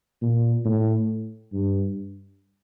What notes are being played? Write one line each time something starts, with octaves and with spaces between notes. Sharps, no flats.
A#2
A2
G2